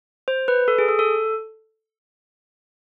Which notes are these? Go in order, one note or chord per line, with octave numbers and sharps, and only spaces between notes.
C5
B4
A4
G#4
A4
A4